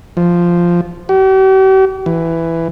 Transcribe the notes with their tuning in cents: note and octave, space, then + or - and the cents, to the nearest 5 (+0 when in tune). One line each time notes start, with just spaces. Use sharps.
F3 -5
G4 -45
E3 +5